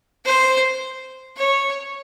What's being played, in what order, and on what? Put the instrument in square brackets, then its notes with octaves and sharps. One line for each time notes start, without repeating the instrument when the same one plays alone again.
[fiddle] C5
C#5